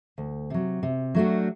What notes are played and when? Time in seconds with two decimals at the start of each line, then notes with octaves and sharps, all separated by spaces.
0.18 D2
0.50 C3 F#3
0.83 C3
1.15 F#3 A3 D4 F#4